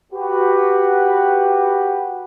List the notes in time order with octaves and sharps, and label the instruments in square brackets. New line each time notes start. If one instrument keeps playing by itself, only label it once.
[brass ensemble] F#4 G4 B4